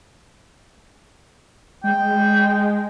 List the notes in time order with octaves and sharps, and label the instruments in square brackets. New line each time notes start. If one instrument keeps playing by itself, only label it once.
[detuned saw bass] G#3 [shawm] G5